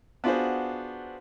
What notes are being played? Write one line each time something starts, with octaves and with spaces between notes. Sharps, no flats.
B3 D4 F4 F#4 G#4 C5